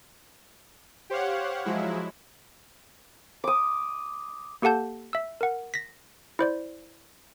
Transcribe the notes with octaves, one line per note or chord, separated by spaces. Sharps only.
G4 C5 C#5 F5 F#5
F3 F#3 G#3 E4
D6 D#6
A#3 G4 A4 F#5 A5 G6
E5 E6
A#4 F#5
A#6 B6
E4 C5 D5